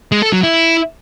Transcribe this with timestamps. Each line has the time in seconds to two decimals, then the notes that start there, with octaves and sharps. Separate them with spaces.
0.12 G#3
0.22 A4
0.33 F#3
0.43 E4